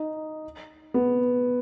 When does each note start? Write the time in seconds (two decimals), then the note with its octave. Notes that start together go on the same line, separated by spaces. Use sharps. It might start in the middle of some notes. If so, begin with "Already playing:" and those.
Already playing: D#4
0.94 B3